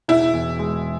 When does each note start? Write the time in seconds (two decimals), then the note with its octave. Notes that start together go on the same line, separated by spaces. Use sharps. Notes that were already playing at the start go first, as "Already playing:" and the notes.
0.08 E1 E4
0.33 E2
0.59 G#3